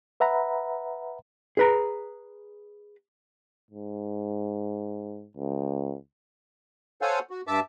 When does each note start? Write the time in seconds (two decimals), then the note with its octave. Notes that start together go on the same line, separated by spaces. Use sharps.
0.20 B4 E5 F#5 A#5 B5
1.57 G#4 B4 A#5
3.71 G#2
5.37 C#2
7.02 A4 C5 C#5 F5 F#5 G#5
7.30 F#4
7.47 G2 E5 A5 D6 E6